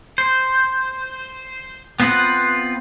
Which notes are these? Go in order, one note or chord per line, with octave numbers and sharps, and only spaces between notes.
C5
B3 C4 F4 B4 F#5